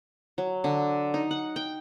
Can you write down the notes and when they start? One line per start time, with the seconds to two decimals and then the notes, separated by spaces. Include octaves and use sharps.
0.38 F#3
0.64 D3
1.14 D#4
1.31 F#5
1.56 G5